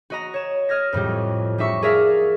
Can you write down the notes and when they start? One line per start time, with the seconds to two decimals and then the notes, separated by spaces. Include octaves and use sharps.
0.10 F#4 D#5 A#5
0.34 C#5 E7
0.69 D#5 F6 G#6 A#6
0.93 F2 A2 F#3 G3
1.58 G3 D#4 E5 C#6 C#7
1.82 G#4 A#4 D5 E5 F5